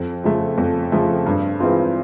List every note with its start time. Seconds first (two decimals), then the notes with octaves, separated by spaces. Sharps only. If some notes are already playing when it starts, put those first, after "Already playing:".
Already playing: F2
0.24 C#3 F3 A3
0.58 F2
0.92 C#3 F3 A3
1.26 G2
1.60 E3 G#3 C4 F4